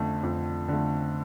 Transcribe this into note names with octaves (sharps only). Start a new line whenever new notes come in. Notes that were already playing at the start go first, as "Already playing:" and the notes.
Already playing: F2 D3 A3
F2
D3 A3